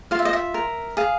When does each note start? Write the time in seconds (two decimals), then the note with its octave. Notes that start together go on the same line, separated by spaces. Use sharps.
0.11 F4 F5
0.19 E5
0.25 D#5
0.33 E5
0.54 A#4
0.97 G#4 F5